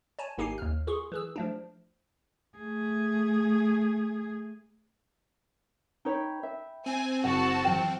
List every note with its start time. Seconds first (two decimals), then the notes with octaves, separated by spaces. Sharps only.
0.19 C#5 G#5 A5
0.38 G#1 A#3 D#4 G4 G#5 C7
0.58 D#2 F6
0.87 F4 G#4 C6 C#6
1.12 E3 G#4 E6
1.36 F3 A3 D4
2.58 A3 G#4
6.05 D#4 C#5 G5 B5
6.43 E5
6.86 C4 G#5
7.24 F#1 F#4 F#5 A5
7.65 E3 F#3 F4 G5